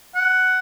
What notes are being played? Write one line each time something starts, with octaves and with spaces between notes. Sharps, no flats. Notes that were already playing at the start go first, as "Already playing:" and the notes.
F#5